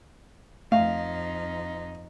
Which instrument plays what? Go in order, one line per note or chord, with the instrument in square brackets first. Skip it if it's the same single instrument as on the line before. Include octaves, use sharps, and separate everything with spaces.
[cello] F2 D#4 [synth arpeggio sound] A3 [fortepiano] F5